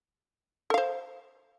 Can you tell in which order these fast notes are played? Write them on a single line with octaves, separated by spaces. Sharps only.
A4 F5 C5